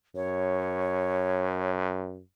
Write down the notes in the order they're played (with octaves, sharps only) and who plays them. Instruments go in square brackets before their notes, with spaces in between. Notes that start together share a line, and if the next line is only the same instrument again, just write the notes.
[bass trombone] F#2 [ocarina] C#5